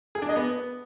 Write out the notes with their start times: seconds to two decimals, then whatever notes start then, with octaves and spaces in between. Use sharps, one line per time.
0.15 G#4
0.22 D4
0.29 D#5
0.36 B3